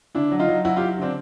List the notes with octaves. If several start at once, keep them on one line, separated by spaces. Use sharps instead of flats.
D3 D4 E4
F#3
D#4 F4
F#3
F#3 E4 F#4
F4 G4
F#3
D3 C4 D4